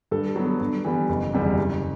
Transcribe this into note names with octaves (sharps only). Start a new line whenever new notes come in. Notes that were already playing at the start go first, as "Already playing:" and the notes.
G2 A4
F#3 B3
G2
E3 G3 B3
F#1
E2 C3 G3
F#1